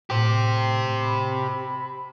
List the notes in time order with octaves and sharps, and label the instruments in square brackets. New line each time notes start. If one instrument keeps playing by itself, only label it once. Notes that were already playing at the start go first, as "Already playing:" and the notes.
[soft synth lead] A2 [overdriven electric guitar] G4 C5
[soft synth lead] B5